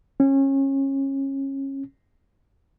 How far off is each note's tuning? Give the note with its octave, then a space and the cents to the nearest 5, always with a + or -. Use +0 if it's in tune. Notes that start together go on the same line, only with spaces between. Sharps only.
C#4 -25